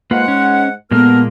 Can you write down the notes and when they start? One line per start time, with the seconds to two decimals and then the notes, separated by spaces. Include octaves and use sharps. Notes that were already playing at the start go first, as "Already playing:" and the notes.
0.11 G#2 G#3 A#3 F4 B4 F#5
0.28 C#4
0.91 A#2 G#3 A#3 B3 A4 A#4 F6